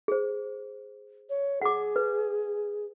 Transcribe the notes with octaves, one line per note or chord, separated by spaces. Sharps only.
G#4 C5
C#5
G#4 F#5 D6
B4